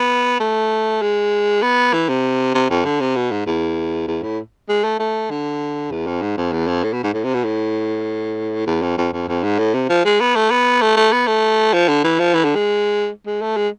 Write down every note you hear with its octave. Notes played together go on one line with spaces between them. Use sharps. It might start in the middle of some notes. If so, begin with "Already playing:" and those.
Already playing: B3
A3
G#3
B3
E3
C3
C3
F2
D3
C3
B2
G#2
E2
E2
A2
G#3
A3
A3
D3
E2
F2
G#2
F2
E2
F2
A2
B2
G#2
A2
C3
B2
A2
E2
F2
F2
F2
F2
G#2
A2
C3
F3
G#3
B3
A3
B3
A3
A3
B3
A3
F3
D3
E3
F3
E3
D3
G#3
G#3
A3
G#3